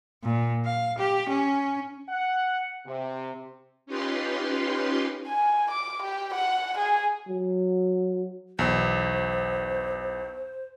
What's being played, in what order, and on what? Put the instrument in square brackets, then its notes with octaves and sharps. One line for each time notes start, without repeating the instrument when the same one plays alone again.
[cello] A#2
F5
G4
C#4
[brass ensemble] F#5
C3
[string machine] C#4 D#4 F4 G4 B4 C6
[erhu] G#5
D6
G4
F#5
G#4
[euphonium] F#3
[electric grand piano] B1 E2 [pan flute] C5